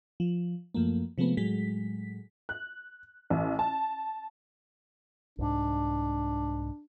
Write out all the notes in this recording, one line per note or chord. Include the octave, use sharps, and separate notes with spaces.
F3
F#2 F3 A3 A#3
C3 F3 G#3 A3 B3
A2 F#3 G#3 B6
F#6
A1
A5
C2 G#2 D4